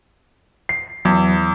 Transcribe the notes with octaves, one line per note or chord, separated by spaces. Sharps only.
C7
E2 F#3